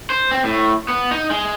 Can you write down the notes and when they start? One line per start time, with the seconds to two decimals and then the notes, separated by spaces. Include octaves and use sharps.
0.10 C5
0.31 C4
0.44 A2
0.88 B3
1.11 D#4
1.31 G#3